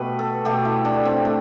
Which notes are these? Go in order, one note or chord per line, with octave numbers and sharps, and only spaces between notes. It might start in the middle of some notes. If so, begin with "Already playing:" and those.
Already playing: B2 A3 G4 B4
A4
B2 A3 G4
E4
D4
C4
A3